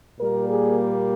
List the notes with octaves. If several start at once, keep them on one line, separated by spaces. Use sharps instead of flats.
A#2 G3 A#3 A#4
G#4